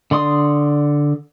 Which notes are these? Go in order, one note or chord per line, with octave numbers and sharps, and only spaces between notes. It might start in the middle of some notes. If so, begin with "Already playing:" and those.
D3 D5 C6 D#6